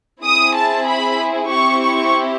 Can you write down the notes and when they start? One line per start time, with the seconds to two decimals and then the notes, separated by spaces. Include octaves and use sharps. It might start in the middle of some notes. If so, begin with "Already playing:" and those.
0.23 C4 E4 G#4 D#6
0.55 A5
0.87 B5
1.51 C4 E4 G4 C#6
1.83 C#6